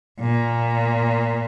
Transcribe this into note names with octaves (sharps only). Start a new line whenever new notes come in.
A#2